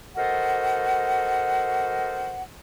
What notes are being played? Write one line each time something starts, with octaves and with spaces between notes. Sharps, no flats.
F#4 A4 A#4 C5 D#5 F#5